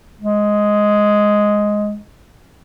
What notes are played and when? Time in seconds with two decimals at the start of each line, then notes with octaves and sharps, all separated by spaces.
0.21 G#3